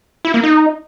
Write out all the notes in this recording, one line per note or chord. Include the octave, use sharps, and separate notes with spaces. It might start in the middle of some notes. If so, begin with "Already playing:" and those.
E4
A#3
D#4